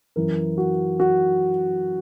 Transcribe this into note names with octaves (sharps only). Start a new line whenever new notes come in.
F#2 E3 A#4
F#4
F#4